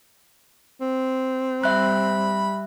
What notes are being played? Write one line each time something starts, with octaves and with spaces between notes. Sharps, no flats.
C4
G3 E5 B5 F#6